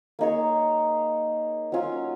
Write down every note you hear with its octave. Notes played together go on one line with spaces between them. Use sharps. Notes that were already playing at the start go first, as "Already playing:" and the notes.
A#3 D#4 G#4 C#5
F#3 C#4 F4